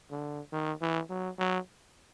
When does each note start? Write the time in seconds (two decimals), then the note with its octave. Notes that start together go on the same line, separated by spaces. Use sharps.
0.11 D3
0.53 D#3
0.81 E3
1.09 F#3
1.39 F#3